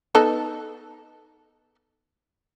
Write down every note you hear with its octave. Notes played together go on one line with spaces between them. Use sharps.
B3 D#4 A4